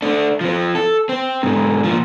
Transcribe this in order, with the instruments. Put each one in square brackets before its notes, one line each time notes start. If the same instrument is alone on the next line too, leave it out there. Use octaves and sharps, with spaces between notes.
[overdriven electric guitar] A3 D4
F3 C4
A4
C4
G#2 D3
A#2 F3